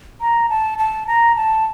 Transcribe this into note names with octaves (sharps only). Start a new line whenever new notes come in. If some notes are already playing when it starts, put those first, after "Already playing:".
A#5
A5
A5
A#5
A5